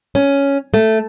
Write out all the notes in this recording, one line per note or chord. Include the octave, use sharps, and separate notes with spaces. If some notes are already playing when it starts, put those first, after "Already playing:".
C#4
A3